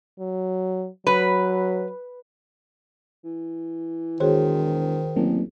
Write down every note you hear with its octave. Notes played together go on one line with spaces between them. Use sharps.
F#3
F#3 B4
E3
E1 D#3 F#4 G#4 C5 C#5
A1 F#3 A#3 C4